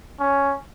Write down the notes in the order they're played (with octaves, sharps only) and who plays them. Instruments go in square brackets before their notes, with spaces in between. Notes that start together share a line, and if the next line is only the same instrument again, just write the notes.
[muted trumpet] C#4